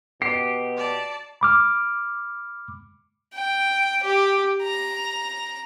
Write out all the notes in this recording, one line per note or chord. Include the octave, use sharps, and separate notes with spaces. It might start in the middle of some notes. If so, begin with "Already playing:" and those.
B2 G4 C7
D5 A5
B5 D6 F6
G5
G4
A#5